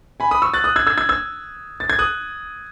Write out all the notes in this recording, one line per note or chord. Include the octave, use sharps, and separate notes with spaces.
G#5 B5
B5 D#6
C#6 E6
F#6 A6
D#6 F#6
E6 G#6
E6 G#6
E6 G#6
E6 G#6
A6
G#6
D#6 F#6